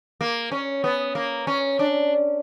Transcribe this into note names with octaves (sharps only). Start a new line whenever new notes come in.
A#3
C#4
B3
A#3
C#4
D4